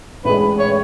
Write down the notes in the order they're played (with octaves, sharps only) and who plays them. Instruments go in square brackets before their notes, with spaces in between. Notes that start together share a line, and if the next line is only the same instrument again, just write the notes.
[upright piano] A1 A2 G#3 D4 G#4 [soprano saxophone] B4
[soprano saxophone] C#5